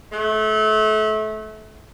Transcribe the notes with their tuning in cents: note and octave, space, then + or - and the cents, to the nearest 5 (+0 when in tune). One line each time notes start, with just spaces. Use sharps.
A3 -30